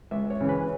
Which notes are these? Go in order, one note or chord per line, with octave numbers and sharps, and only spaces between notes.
C#2 E5
C#5
C#3 E3
B4